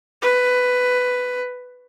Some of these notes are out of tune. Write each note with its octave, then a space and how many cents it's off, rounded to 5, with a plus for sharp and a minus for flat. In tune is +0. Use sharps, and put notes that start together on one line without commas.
B4 +10